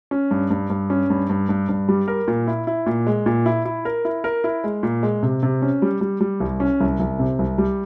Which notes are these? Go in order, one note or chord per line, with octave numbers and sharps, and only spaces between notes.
C#4
G2
G2
G2
C#4
G2
G2
G2
G2
G3
A#4
A#2
E4
E4
A#2
G#3
A#2
E4
E4
A#4
E4
A#4
E4
G#3
A#2
G#3
C3
C3
C#4
G3
G3
G3
C2
C#4
C2
C2
C3
C2
G3